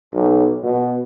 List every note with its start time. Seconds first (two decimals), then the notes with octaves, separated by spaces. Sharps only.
0.13 B1
0.63 B2